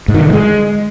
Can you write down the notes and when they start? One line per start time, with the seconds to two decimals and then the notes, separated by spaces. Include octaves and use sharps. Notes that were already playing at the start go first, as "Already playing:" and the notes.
0.08 G#2
0.15 D#3
0.21 D3
0.27 E3
0.33 G#3